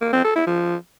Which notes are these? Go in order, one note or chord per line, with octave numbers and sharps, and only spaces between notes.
A#3
C4
A4
E4
F3